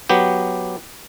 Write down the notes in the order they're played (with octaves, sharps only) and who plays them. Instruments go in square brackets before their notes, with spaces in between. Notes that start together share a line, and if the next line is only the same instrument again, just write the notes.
[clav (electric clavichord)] F#3 B3 G4